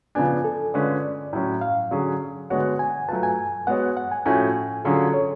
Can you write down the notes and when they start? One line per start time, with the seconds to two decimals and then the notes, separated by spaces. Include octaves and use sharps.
0.15 C#3 F3 B3 D4 G#5
0.44 A4
0.74 D3 G#3 C#4 F4 B4 D5
1.33 A2 F#3 C#4
1.61 F5
1.91 D3 F#3 C#4 G#4 C#5
2.50 D3 G#3 B3 F#4 C#5 F#5
2.79 G#5
3.08 F#3 A3 F4 B4 A5
3.23 G#5
3.67 G#3 B3 F#4 C#5 F#5
3.97 F#5
4.12 G#5
4.25 A2 F3 A3 C#4 F#4 G#5
4.85 D3 F#3 C#4 F4 G#4 A4
5.14 C#5